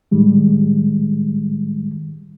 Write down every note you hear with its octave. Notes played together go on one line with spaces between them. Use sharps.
A2 D#3 G3 G#3